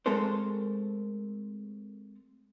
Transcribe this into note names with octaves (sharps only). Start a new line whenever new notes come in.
G#3 A3 C4 A4 A#4 C5